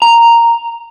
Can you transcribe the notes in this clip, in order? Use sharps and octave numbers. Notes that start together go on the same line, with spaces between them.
A#5